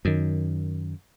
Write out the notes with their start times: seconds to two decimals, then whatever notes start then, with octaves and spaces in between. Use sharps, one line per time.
0.05 F#2 D#3